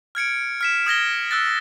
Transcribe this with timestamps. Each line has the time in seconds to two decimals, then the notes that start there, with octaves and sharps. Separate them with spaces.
0.15 F6 G#6 C#7 D7
0.61 F6 B6 E7
0.86 D#6 G#6 A#6 G7
1.31 E6 F#6 A6